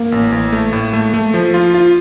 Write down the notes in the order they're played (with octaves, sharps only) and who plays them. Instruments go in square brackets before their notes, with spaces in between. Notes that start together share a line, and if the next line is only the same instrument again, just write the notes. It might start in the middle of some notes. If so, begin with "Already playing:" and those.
Already playing: [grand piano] A#3
[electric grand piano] A1
A1
A3
A2
A3
A3
F3
F4
F4